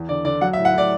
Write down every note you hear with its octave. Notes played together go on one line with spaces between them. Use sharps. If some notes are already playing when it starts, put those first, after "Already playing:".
Already playing: E2
D3 D5
D3 D5
F#3 F#5
E5
A2
F#5
A2 D5